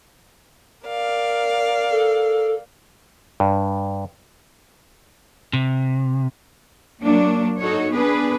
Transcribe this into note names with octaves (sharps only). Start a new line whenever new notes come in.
A#4 D5 F5
A4
G2
C3
F#3 A#3 D4
D#4 F#4 A4 C#5
B3 D4 G#4 B4